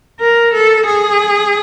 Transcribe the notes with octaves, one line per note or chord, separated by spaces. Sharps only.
A#4
A4
G#4